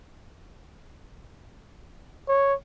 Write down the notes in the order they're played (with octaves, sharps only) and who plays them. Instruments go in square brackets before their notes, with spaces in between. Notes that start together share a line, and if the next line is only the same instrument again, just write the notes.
[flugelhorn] C#5